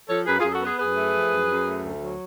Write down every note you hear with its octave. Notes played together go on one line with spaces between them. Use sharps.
F3 A4 C#5
F#2 G#4 B4
F4 G#4
F#2
F#4 A4
B3 G#4 B4
F#2 G#4 B4
A3
F3
F#2
F#2
A3
D2
F#3